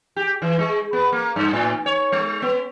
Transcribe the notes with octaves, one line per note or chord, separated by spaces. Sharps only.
G4
E3
G#3
B3
A#3
G2
A2
C#5
G#3
B3